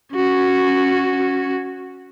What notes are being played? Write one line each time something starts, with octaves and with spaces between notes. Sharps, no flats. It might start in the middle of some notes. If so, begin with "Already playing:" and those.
C#4 F#4